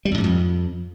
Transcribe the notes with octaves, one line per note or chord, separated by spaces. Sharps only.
G3
F2
G#2
F2